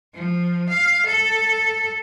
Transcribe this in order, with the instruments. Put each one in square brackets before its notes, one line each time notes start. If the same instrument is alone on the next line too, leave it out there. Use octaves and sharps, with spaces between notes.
[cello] F3
F5
A4